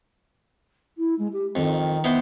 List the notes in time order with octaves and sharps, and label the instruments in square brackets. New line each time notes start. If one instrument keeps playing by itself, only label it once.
[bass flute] E4
G#3
G4
[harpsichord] F2 [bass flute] D#3
[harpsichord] B3 E4 C5